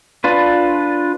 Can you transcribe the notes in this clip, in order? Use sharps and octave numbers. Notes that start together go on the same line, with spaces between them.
D4 F4 B4